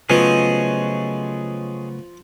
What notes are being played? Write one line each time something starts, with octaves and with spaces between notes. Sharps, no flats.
C#3 F3 F#3 A3 B3 G#4 C#5 D#5